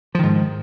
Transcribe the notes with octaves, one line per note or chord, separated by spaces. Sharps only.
G#2 D#3 F3